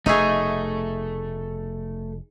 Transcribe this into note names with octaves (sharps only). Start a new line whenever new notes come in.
F1 B2 A3 D#4 G#4 A#4 C#5 E5